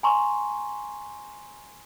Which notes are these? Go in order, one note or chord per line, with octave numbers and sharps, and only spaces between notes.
G#5 A#5 C6 C#6